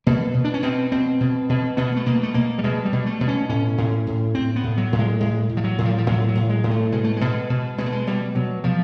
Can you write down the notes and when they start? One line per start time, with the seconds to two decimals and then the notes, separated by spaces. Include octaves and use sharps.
0.07 B2 A#3
0.34 B2
0.44 D4
0.54 C#4
0.63 B2 C4
0.92 B2 C4
1.20 B2
1.49 B2
1.77 B2 B3
1.97 A3
2.06 B2 A#3
2.23 A3
2.34 B2 A#3
2.58 G3
2.64 B2 G#3
2.85 G3
2.92 B2
3.06 A3
3.21 B2
3.28 C#4
3.49 A2 C#4
3.78 A2
4.07 A2
4.35 A2 C4
4.56 B3
4.64 A2
4.77 F#3
4.92 A2
4.99 G#3
5.20 A2 G#3
5.49 A2
5.57 F3
5.64 F#3
5.78 A2
5.85 F3
5.98 F3
6.06 A2 F#3
6.28 F#3
6.35 A2
6.49 G#3
6.63 A2
6.71 A3
6.92 B2 G#3
7.04 A3
7.17 B2 G#3
7.50 B2
7.78 B2 G#3
7.86 A3
7.92 G#3
8.07 B2 G3
8.35 B2 F#3
8.64 B2 F3